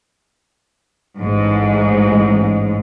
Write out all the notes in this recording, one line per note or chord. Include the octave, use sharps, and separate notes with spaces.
A1 G#2